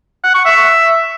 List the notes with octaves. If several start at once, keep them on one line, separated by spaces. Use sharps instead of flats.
F#5
C#6
E5